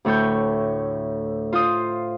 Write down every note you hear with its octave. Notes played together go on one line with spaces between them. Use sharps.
D2 A2 A4 C#5 G6
F4 C5 D#6